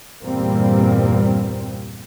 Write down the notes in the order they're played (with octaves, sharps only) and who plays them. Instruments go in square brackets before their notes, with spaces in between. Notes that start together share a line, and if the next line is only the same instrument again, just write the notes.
[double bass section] E2 G2 A#2 G3 A#3 C4